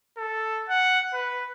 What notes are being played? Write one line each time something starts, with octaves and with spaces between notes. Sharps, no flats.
A4
F#5
B4